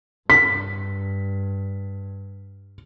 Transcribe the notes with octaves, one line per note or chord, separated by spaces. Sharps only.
G2 B6